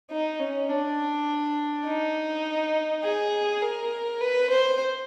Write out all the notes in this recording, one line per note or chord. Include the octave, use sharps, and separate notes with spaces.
D#4
C#4
D4
D#4
G#4
A#4
B4
C5